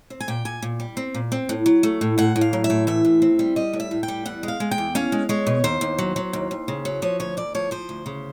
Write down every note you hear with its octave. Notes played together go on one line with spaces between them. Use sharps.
C4
G#5
A#2 G5
A#2 G#5
A#2
G3
C4
A#2
C4
A2
F#3
A3
A2
A2 F#5
A2
F5
F#3
E5
A2
E3 E5
A2
C4
G3
G3 D#5
A2
E5
A2
G5
G3
E2 F#5
G#3
F5
G#3
G5
E2
C#4 F5
G#3
G#3 C#5
B2
D#2 C5
D#2
F#3
F#3
D#2
D#2
C#3
F#3
F3 C#5
D2 C#5
D2 D5
F3 C#5
F3 C5
D2
C#3